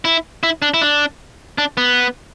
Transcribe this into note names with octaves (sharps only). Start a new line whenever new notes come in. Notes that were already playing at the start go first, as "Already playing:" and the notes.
E4
E4
D4
E4
D4
D4
B3